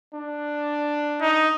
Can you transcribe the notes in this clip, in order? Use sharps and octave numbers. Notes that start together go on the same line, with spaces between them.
D4
D#4